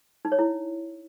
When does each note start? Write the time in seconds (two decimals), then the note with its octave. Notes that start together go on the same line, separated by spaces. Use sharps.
0.25 D#4
0.32 C#5
0.39 E4